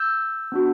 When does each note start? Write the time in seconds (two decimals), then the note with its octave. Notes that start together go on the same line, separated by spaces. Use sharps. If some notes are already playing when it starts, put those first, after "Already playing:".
Already playing: E6 G6
0.52 B3 D4 F#4